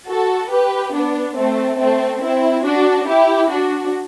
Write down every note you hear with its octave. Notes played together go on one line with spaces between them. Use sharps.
F#4 A4
G4 B4
B3 D4
A3 C4
A3 C4
C4 E4
D4 F#4
E4 G4
D4 F#4